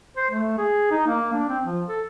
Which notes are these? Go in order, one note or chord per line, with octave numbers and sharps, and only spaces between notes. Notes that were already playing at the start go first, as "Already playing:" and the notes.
C5
A3
G#4
D#4
A#3
D4
C4
F3
A4